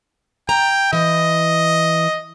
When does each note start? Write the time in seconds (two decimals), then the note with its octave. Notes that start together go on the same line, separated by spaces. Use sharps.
0.49 G5 A#5
0.93 E3 D#5